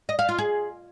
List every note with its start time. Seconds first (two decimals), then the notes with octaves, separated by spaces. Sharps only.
0.09 D#5
0.19 F5
0.29 F4
0.38 G#4